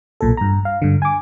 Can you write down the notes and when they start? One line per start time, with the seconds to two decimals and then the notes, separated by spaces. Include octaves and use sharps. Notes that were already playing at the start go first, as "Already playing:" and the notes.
0.21 B1 A#2 A4
0.37 G2 A#5
0.65 F5
0.82 G2 D3
1.02 G#5 D6